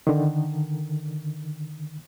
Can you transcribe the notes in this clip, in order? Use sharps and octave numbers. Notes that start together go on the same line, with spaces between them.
D3 D#3